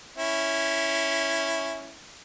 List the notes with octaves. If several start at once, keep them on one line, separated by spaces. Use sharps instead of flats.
C#4 E4